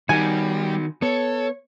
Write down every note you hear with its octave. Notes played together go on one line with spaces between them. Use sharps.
D#3 G3 D#4 F#4 G#5
B3 A4 C#5